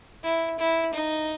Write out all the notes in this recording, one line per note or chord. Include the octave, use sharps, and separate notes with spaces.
E4
E4
D#4